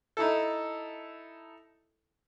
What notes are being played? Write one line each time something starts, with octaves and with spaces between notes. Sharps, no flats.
D#4 E4 A4